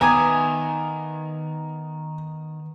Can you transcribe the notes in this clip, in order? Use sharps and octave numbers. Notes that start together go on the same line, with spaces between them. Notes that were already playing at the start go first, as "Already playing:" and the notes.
D#3 B3 E5 G#5 A#5 D6 D#6 G#6